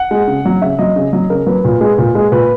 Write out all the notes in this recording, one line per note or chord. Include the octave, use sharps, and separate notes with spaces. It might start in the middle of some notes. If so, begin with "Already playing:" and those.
Already playing: F#5
G#3
C#3
F#3
C#3 E5
F#3 D#5
C#3
F#3
C#3 A#4
F#3 B4
A#2
G#3
A#2
G#3
A#2 B4